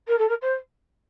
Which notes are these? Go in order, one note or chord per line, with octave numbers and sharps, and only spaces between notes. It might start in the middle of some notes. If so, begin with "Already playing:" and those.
A#4
A4
A#4
C5